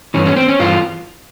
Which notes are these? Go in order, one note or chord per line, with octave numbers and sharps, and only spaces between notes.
G2 E3 C#4
C#4
C4
C#4
G2 E3 F4